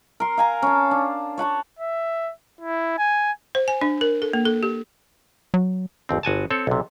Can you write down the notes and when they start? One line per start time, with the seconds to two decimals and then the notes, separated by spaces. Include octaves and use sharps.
0.20 A#4 C6
0.38 F5 G#5 A#5
0.62 C#4 A5
0.91 D4
1.37 C#5 F#5 A5 C#6
1.79 E5
2.61 E4
2.98 G#5
3.55 C5
3.68 G#5
3.81 D4
4.01 A#4
4.22 A4
4.33 A#3
4.46 A4
4.63 G4
5.54 F#3
6.09 G1 D#2 C4
6.23 G1 F#4 G#5 A5
6.50 C4 A4 C#5
6.67 B1 C3